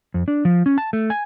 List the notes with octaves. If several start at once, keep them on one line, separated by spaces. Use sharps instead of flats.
F2
D4
F3
C#4
A5
A3
G#5